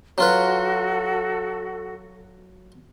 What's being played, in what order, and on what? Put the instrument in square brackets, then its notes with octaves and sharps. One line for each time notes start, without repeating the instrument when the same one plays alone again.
[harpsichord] F#3 F4 B4 [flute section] F#4 A4